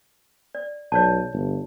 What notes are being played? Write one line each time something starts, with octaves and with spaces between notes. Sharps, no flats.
D5
B1 C#5 D5 A5
G1